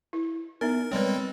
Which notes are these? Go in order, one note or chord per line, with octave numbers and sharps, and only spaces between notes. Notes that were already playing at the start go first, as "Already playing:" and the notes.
E4
B3 D#4 A#4 E5
G3 G#3 C4 B4 C#5